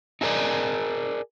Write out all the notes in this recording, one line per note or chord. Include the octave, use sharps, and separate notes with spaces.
D#4 E4 G#4 A#4 D5 D#5